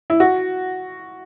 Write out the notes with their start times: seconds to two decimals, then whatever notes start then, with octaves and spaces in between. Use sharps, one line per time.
0.10 E4
0.20 F#4